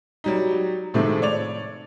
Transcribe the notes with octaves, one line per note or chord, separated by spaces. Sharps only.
F#3 G3 D#4
A2 C3 D#3 F3 G#3 A3
C#5 D5 F7